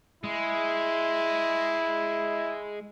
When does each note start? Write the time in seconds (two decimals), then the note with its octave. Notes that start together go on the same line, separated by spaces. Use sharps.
0.24 G#3 E4